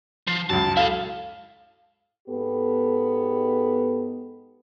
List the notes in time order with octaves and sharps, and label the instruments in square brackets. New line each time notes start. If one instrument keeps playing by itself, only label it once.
[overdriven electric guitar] F3 [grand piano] C7
[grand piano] C#2 F#2 [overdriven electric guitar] A5
[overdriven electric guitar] E4 A4 [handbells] F5
[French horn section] G#2 B3 G4 A4